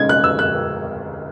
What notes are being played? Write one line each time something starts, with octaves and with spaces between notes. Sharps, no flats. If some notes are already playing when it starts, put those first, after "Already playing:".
Already playing: C#3 G#3 D#4 G#6
F#6
E6
F#6